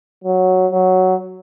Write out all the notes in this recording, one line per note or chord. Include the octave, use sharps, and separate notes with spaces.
F#3
F#3